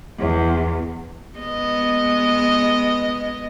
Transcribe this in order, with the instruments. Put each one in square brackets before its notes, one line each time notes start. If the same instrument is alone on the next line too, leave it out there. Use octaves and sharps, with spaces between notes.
[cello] E2
[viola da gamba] G#3 B3 D#5